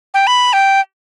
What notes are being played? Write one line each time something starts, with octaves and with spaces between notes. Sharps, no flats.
G5
B5
G5